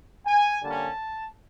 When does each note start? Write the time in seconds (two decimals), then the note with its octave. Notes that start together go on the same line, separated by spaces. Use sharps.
0.26 G#5
0.63 D3 G3 A#3 C#4 A5